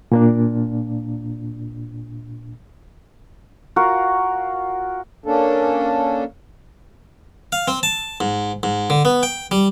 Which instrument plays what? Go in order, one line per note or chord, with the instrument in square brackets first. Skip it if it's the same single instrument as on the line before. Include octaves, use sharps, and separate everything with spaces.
[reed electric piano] A#2 A#3 D4
[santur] F4 F#4 A#4
[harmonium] A#3 C#4 D4 A4
[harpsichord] F5
C4
A5
G#2
G#2
D3
B3
G5
G3